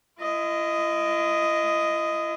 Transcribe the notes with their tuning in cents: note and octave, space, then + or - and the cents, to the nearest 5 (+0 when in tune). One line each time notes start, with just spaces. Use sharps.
E4 +45 D#5 +0